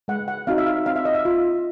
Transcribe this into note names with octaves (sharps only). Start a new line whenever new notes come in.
G#3 F#5
F#5
C4 D#4 F#4 F5
E5
F5
C4 F5
E5
D#5
E5
F4